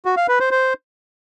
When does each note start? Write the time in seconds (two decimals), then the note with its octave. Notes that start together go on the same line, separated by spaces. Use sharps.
0.06 F#4
0.17 F5
0.28 B4
0.40 C5
0.51 C5